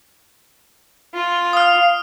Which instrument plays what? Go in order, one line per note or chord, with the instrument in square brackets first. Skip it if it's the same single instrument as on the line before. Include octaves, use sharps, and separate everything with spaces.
[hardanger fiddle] F4
[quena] F5 [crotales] D#6 F6